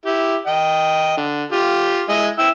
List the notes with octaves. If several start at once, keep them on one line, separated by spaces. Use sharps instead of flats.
E4 G4
D#5 G5
D3
F4 G4
G#3 E4 D#5
E4 G5 E6